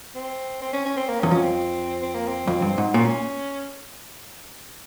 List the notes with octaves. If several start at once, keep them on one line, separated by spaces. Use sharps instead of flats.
C4
C4
C#4
C#4
C4
A#3
C#4
E2
F2 C#4
C4
C4
A#3
C4
F2
G2
G#2
A#2 C#4